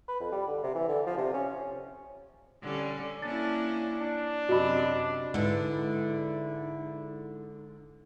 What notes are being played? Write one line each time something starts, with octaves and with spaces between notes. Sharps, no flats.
B4
F2
G3
D3
C3
E3
D3
F3
C3
C#4
D3 G3 C#4
A#3 C#4 D4 E4 A6
D4
F#2 C3 F#4 D#5 B5
G#2 D3 G#3 D#4 E4 B4